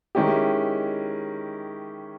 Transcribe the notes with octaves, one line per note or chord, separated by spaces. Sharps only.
D#3 G#3 C#4 E4 G4